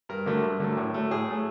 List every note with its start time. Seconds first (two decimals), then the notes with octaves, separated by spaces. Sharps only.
0.09 G2 A#4
0.26 D3 F#3 A3
0.43 G2
0.60 D3 F#3 A3
0.77 A2
0.94 F#3 A3
1.11 A2 G#4
1.28 F#3 A3